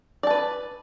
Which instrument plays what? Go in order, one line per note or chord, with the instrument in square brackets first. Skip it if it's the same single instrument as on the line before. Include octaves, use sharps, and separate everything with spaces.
[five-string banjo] D5
A5
B4